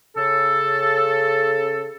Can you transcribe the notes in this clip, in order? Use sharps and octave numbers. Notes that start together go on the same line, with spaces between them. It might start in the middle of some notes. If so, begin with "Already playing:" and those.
C#3 A4